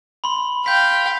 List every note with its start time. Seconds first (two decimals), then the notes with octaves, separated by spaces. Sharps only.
0.24 B5 C6
0.66 F5 G5 G6 B6